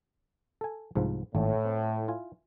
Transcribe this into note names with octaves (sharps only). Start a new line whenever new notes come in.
A4 G#5
C2 G#2 F3
G#1 A2 A3
C4
E4 F4 G#5